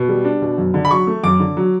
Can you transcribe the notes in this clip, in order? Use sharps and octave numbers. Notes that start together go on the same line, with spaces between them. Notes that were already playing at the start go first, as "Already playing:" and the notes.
Already playing: B2
G3
D4
B2
F#2
D3
B5
F#3 C#6
A3
F#2 D6
D3
F#3